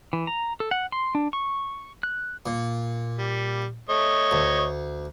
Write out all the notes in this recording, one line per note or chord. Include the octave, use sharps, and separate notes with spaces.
E3
A#5
A4
F#5
C6
D4
C#6
F#6
A#2
G3
A3 C#5 D#5
D2